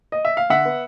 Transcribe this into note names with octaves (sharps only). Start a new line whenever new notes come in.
D#5
E5
F5
D3 E5 F#5
B3